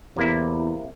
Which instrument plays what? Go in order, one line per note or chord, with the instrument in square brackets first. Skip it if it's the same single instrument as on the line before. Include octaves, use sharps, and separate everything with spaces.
[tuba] E2 [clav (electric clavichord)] C3 A#3 E4